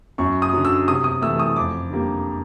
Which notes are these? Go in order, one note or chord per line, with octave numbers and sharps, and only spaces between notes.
F#2 C#6
D#6
D3 F#3
E6
C3 D#6
D#6
E3 A3 E6
D#6
F2 D6
D3 G3 A#3